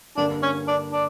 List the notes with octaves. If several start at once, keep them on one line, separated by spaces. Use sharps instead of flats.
G2 D3 A#3 D4
C#4
D4
D4